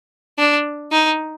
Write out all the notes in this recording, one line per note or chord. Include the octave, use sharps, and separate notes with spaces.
D4
D#4